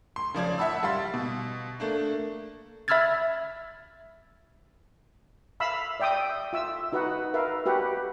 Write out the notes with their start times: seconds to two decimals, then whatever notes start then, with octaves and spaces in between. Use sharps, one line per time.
0.16 C6
0.34 C#3 F3 D5 G#6
0.58 E5 F#5 A5 B5 E6
0.83 G3 F5 C6 A6
1.14 B2
1.80 A3 A#3 D4
2.88 E5 B5 E6 F6 G#6 A6
5.60 E5 F5 B5 E6
6.00 D5 E5 G5 D6 D#6
6.53 F4 E5 E6
6.92 D#4 F#4 B4 D#5 F#5
7.34 A#4 B4 E5 F5
7.66 F#4 G4 B4 F#5